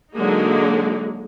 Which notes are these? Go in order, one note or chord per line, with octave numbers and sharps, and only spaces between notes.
D3 F#3 G#3 A#3 D#4